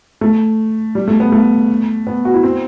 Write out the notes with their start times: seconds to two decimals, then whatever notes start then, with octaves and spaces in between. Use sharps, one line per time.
0.21 A3
0.95 G3
1.08 A3
1.20 B3
1.32 A3
2.07 B3
2.25 F#4
2.34 E4
2.43 C4